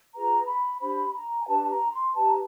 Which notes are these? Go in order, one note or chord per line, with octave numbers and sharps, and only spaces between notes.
F4 G#4 B4 A#5
B5
D4 G4 C5 B5
A#5
G#5
D4 G4 B4 A5
A#5
C6
D#4 G4 B4 A5
A#5